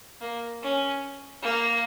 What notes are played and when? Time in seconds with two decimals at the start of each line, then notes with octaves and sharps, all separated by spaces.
0.21 A#3
0.62 C#4
1.43 A#3